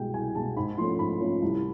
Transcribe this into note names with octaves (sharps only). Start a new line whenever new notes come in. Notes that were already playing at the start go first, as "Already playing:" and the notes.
Already playing: C2 B2 G#3 G5
C2 G#5
B2 G#3 A5
G#2 B5
F3 A3 C#4 C6
G#2 B5
F3 A3 C#4
C2